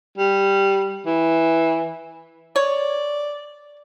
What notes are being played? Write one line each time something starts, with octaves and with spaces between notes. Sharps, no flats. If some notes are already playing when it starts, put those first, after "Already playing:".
G3
E3
C#5 D5